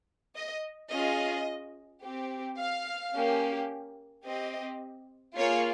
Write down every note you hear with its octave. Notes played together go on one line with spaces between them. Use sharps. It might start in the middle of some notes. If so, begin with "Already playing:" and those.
D#5
C#4 F4 G#4 D#5
C4 G4
F5
A#3 C#4 G4
C4 G4 D#5
A#3 F4 G#4 C#5